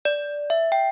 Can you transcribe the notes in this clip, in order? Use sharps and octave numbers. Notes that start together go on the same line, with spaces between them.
D5
E5
G5